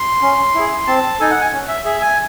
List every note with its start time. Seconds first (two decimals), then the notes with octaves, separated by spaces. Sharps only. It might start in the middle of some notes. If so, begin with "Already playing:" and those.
Already playing: C6
0.22 C#4
0.55 E4 G#4
0.87 C4 A5
1.20 D#4 A4 G#5
1.31 F#5
1.41 G#5
1.53 C#4
1.68 E5
1.85 G#4 E5
2.01 G#5